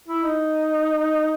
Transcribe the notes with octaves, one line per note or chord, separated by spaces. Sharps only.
E4
D#4